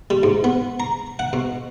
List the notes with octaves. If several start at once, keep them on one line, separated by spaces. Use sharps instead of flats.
G3
G#2
B3
A#5
F#5
B2